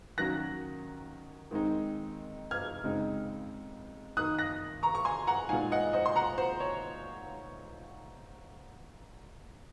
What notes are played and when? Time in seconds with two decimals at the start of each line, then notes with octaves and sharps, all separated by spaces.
0.18 D#3 F#3 A#3 C#4 F#6 A#6
1.51 D#3 G#3 C4 D#4
2.51 F6 G#6
2.84 C#3 G#3 C4 D#4
4.17 D#3 A#3 D#4 D#6 F#6
4.39 F#6 A#6
4.83 A#5 C#6
4.95 C#6
5.05 G#5 C6
5.27 F#5 A#5
5.49 A#2 G#3 D#4 F5 G#5
5.72 D#5 F#5
5.93 C5 D#5
6.06 C6
6.16 F#5 A#5
6.38 C5
6.60 C#5